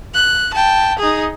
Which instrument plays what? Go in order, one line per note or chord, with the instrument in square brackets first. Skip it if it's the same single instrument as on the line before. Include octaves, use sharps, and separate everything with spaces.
[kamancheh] F#6
G5 A5
D#4 G#4